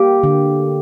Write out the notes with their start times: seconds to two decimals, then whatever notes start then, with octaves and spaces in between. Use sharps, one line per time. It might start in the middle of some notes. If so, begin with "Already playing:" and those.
Already playing: A#3 G4
0.23 D3